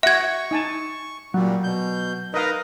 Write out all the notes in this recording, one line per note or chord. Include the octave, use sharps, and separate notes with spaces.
F#4 E5 F#5 C#6 G#6
D#4 G#5 A5
A#2 F#3 G3
B2 G6
D#4 A#4 B4 D#5 F5